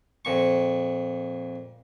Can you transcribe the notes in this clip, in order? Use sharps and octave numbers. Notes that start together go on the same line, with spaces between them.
F2 A#2 C#6